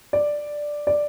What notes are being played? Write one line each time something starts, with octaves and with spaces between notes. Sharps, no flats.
D5
D5